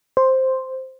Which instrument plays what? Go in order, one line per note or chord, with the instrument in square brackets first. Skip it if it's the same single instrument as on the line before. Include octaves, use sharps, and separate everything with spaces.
[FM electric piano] C5